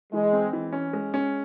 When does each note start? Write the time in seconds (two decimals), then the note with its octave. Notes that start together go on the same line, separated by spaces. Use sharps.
0.13 E3 G#3
0.33 C4
0.53 E3
0.73 C#4
0.93 G#3
1.14 C#4